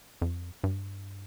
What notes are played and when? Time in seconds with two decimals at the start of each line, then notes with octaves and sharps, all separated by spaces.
0.21 F2
0.64 G2